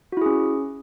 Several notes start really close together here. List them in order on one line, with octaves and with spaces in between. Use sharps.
F#4 E4 G#4 C#4